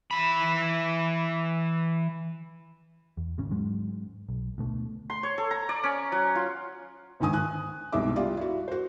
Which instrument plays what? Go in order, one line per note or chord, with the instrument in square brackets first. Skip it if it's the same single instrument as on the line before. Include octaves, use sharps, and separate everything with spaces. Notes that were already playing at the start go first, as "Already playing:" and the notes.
[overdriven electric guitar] E3 B5
[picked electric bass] E2
G#1 C#3 C#4
G#2 F#3 G#3
B1
D2 B2 A3
[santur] C6
C#5
A4
A#5
D5
C#4
F#3
F4
[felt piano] C#2 G#2 D#3 G#5 D#6
G#5 F#6
C2 B2 G#3 D#4 E5 D6
G3 E4 F4 D5
E4 F#4
F#4 C5